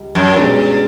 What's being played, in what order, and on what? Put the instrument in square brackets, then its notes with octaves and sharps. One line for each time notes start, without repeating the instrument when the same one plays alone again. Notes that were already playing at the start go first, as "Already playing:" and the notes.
Already playing: [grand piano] C#2 G3
[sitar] F#2
[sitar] G2 [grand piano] B2 G#3 C#4 F#4